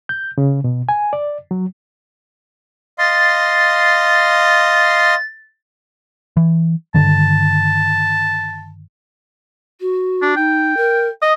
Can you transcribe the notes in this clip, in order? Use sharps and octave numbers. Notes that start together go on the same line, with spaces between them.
G6
C#3
B2
G#5
D5
F#3
D#5 F5 C6 A6
E3
G2 D3 D#3 A5
F#4
D4
D#4 G5
A#4
D#5 D#6